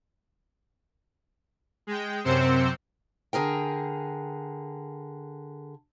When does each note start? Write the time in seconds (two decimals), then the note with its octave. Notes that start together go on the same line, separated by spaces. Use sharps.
1.87 G#3 G5
2.24 F#2 C3 C4 C5 E6 C#7
3.33 D3 G#4 A#4 G5